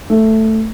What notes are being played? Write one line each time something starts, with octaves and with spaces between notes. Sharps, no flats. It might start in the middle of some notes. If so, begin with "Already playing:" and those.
A3